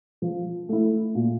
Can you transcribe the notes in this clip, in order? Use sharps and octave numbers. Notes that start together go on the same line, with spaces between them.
F3
A3 E4
A#2